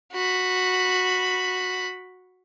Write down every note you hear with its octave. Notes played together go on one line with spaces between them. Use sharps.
F#4 B5